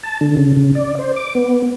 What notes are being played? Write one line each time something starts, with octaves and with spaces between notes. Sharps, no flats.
A5
D3
C#3
C#3
D5
C5
D6
B3